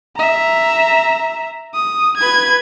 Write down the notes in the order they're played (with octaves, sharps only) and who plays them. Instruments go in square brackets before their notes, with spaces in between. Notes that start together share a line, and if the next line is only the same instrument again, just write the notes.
[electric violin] E5 A#5
D#6
B4 G#6